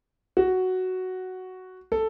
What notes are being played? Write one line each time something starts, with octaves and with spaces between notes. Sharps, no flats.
F#4
A4